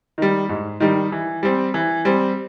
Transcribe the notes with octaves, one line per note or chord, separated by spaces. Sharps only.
D#3 G3
G#2
D#3 G3
E3
G3 C4
E3
G3 C4